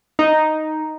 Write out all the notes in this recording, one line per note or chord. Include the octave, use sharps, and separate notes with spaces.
D#4